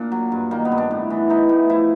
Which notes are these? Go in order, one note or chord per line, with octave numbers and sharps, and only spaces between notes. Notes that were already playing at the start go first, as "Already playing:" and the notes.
Already playing: A#2 A#3 D4
F#3
G2
D#3 A#3
B3
G2
D4
A2
E3
E3 D#4
A2
F3 E4